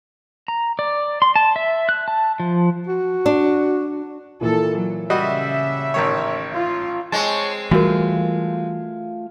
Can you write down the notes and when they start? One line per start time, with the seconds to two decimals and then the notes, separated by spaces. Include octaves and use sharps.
0.48 A#5
0.79 D5
1.22 C6
1.36 A5
1.56 E5
1.89 F#6
2.08 A5
2.40 F3
2.87 F#4
3.26 D4
4.41 A#2 E3 A4
4.76 F#3
5.10 C#3 G3 F#4 D#5 E5
5.94 A1 D#3 C#5
6.53 F4
7.12 G#3 C4 C#5 A5
7.71 E3 G3 A3 F4 F#4 A#4